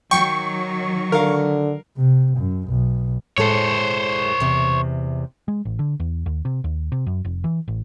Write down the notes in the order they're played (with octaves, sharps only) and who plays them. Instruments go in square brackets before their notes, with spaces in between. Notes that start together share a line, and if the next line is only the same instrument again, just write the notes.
[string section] D#3 F#3 [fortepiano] G5 [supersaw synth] C#6
[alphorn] D3 [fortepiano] A#4 F5
[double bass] C3
F#2
B1
[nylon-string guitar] A2 G#3 A4 [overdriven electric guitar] C5 C#5
[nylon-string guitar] E2 C3
[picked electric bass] G#3
A1
D3
E2
D#2
C3
D#2
C3
F#2
F1
E3
A1